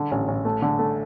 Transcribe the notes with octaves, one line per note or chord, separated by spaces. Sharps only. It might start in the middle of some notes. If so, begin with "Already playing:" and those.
Already playing: D3
A1
A1
A3
D3
A3